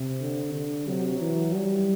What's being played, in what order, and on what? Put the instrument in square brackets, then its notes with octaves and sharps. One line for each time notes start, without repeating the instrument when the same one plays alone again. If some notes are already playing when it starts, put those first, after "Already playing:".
Already playing: [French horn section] C3
[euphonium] D3
D3
[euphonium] C3 [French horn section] F#3
[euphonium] E3
G3